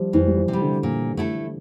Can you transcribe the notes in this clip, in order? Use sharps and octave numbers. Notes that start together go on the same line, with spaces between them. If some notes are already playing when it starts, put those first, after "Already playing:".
Already playing: F3 G3
F2 E3
G3
F3
C3
G3
D3
A#2
A3 E4 A4